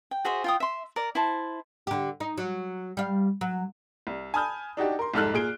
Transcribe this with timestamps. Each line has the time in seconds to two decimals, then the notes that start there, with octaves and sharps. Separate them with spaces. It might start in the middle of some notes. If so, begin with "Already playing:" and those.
0.11 G5
0.25 F#4 G#4 C5 E5
0.44 F4 G5 D#6
0.60 E5 C6
0.96 A#4 D5
1.15 E4 C5 A5
1.87 D3 G4
2.20 D#4
2.37 F#3
2.97 G3 F5
3.41 F#3
4.07 C2
4.34 G#5 A5 B5 D#6 F6 G6
4.77 D4 D#4 F#4 G4
4.99 A#4 C6
5.14 C2 F2 G#2 A4 F6 F#6
5.34 A#2 G#4 D7 G7